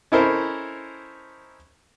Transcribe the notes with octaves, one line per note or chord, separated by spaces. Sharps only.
C#4 D#4 E4 A4 A#4 C5